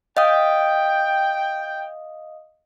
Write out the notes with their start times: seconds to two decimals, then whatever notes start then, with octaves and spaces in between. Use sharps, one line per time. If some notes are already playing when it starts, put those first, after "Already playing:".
0.17 D#5 F5 G5 D#6